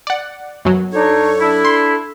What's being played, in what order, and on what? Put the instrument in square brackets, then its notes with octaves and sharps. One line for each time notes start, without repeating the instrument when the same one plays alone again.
[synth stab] D5 F#5
F#2 B2 F#3
[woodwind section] D4 D#4 C#5 [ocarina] A4
[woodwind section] D4 E4
[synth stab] C6